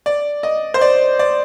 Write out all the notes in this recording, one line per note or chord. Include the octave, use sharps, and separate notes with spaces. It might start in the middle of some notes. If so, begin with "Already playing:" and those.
D5
D#5
C5
D5
D5